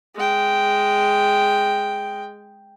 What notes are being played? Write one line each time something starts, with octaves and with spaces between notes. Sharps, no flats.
G#3 G5